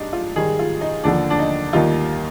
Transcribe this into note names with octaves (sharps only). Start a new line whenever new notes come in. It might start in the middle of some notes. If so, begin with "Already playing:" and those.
Already playing: G#2 G3 D4 D#4
F4
G#2 D#3 G3 G#4
F4
D#4
D#2 D3 F3 D4
D4
D#4
D#2 D#3 G3 F4